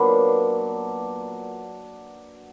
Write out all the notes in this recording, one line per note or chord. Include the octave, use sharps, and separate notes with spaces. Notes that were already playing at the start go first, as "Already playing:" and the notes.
Already playing: A#2 F#3 B3 D4